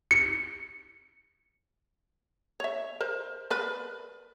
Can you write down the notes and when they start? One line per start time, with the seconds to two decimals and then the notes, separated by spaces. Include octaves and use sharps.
0.11 C#7
2.60 C#5 E5
3.01 A#4 C5
3.50 A#4 B4 D5